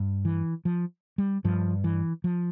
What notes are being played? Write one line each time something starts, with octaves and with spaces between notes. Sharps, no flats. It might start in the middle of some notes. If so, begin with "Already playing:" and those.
Already playing: G2
E3
F3
G3
G2 F3
E3
F3